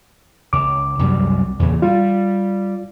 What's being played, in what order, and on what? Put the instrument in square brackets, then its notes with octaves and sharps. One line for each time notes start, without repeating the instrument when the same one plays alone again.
[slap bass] C#2 [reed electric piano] D6
[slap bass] C2 F#2 G3
E2 A#2 C#3
[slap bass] G3 [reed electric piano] F4